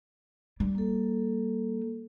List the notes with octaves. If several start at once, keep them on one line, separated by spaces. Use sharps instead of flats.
G3
A#3 A4